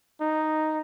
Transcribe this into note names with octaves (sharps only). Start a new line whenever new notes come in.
D#4